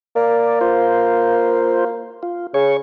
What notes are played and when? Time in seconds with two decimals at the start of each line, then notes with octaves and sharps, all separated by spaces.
0.16 A#3 D5
0.61 F4 C5
2.23 F4
2.54 C#3 C#5 C#6